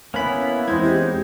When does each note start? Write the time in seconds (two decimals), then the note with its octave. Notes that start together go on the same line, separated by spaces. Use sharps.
0.14 A#3 B3 C#4 E4 B5
0.68 E2 G#3 C4 D#4 E4 C5 G#6
0.84 G4